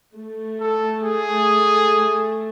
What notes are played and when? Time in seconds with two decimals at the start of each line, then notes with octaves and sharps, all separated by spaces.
0.17 A3
0.61 A4
1.03 G#4